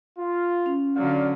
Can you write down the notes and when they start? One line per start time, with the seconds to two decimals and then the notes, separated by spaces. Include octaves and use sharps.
0.19 F4
0.66 C#4
0.96 D3 F#3 D5 F5